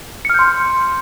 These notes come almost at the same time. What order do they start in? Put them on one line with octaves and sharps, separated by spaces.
C#7 F6 G6 C6